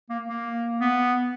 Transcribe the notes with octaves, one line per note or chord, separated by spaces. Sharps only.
A#3
A#3
B3